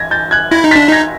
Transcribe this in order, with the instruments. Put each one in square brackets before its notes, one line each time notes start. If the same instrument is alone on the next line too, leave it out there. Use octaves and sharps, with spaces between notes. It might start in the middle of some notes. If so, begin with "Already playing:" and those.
Already playing: [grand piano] G#6 A#6
G6 A6
F#6 G#6
[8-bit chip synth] E4 [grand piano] G#6 A#6
[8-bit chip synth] D#4
[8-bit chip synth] D4 [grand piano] A6 B6
[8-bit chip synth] D#4 [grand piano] G#6 A#6